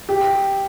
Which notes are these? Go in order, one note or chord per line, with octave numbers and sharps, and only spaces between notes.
G4